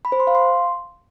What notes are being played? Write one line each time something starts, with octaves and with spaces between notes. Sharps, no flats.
B5
C5
C6
F5
C6